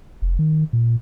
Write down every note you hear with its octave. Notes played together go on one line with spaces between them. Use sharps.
F1
D#3
A#2